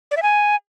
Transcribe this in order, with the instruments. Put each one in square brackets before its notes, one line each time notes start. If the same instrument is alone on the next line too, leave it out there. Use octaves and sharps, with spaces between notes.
[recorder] D5
E5
G#5